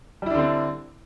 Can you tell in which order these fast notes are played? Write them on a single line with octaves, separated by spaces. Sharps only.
G3 E4 D4 D3 C4